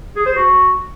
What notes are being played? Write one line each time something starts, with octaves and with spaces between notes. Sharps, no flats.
G#4
C5
F#4